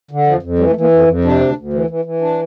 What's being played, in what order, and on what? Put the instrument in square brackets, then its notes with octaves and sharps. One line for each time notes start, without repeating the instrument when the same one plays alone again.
[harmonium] D3
F2 F3
F2
E3 G3
A3
E3
A#3
F2
F2
C3 D4
D2
D2
E3
E3
E3
D4